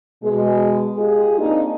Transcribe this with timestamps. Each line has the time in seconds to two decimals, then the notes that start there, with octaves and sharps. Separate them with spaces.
0.22 B2 G#3
0.97 G#3 F4 G4 G#4
1.39 A#3 C4 D4 D#4